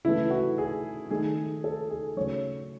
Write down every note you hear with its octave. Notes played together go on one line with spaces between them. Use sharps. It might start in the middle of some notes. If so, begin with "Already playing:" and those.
C#3 E3 A3 E4
F#4
G#4
D#3 A3 G#4
A4
G#4
C#3 F#3 A3 C#5